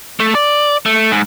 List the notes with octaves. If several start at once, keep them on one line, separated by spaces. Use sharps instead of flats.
A3
D5
A3
G#2